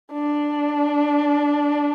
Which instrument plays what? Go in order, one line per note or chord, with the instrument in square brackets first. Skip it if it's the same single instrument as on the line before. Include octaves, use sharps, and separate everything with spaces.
[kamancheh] D4